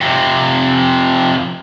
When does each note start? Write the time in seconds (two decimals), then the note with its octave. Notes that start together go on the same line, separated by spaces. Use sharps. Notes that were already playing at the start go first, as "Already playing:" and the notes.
0.01 F2 C3